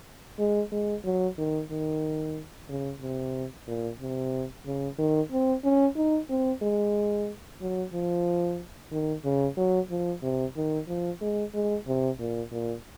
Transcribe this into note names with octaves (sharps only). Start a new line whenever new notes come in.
G#3
G#3
F#3
D#3
D#3
C#3
C3
A#2
C3
C#3
D#3
C4
C#4
D#4
C4
G#3
F#3
F3
D#3
C#3
F#3
F3
C3
D#3
F3
G#3
G#3
C3
A#2
A#2